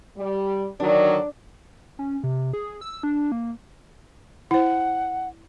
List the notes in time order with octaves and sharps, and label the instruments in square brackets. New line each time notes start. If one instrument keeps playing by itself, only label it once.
[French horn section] G3
[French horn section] D3 D#3 F#3 [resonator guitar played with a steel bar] D4
[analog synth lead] C#4
C3
G#4
E6
D4
A#3
[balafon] E4 C5 [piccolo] F#5